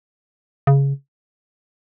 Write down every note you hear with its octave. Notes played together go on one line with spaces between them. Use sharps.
C#3